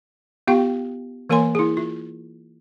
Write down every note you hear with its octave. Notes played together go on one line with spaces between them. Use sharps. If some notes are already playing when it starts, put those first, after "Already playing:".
B3 F4 G4 F5 G5
E3 A#3 A#4 C#5 G#5 C6
E4 G#4
F4